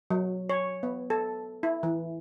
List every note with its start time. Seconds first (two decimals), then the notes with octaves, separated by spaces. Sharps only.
0.10 F#3
0.50 C#5
0.83 B3
1.10 A4
1.63 E4
1.83 E3